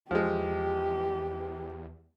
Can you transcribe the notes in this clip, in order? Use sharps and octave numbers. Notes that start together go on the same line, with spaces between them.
E2 F3 G#3 G4